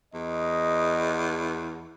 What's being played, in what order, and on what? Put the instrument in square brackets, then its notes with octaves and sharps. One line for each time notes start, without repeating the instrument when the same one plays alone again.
[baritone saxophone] E2 [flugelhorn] D#5